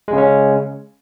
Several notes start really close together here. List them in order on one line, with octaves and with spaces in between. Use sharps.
G#3 C#3 C#4